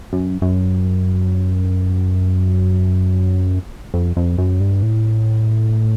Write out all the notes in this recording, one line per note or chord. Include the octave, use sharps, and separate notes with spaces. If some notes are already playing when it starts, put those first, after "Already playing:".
F#2
F#2
F2
F2
F#2
G2
A2